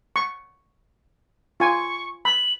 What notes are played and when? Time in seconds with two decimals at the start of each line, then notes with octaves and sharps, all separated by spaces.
0.16 C#6
1.60 F4 G#5 C#6
2.25 B5 F#7